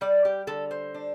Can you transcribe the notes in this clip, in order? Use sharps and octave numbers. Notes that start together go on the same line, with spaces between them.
G3 D5
G4
D3 A4
C5
D4